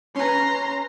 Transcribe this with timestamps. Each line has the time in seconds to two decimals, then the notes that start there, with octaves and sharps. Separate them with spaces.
0.16 C#4 B4 A#5 C6